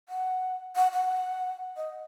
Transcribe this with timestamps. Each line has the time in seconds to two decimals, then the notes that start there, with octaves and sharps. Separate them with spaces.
0.09 F#5
0.76 F#5
0.93 F#5
1.76 D#5